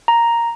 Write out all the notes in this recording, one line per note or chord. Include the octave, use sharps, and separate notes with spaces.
A#5